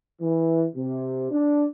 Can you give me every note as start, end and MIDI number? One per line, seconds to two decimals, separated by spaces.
0.21 0.65 52
0.76 1.27 48
1.31 1.66 62